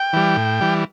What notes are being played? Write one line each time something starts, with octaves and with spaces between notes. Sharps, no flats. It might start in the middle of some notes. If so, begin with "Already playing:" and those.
Already playing: G5
E3 G3
A2
E3 G3